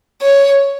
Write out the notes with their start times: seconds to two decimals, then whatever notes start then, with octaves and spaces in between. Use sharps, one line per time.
0.22 C#5